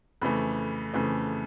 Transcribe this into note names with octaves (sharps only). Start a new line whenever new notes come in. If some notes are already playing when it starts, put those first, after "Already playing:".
F2 C#3 E3 A3 B5
F2 C#3 E3 A3